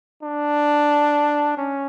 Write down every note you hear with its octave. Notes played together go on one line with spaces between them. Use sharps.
D4
C#4